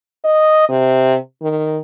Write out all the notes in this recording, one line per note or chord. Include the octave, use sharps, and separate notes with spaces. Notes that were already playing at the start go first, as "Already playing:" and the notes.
D#5
C3
D#3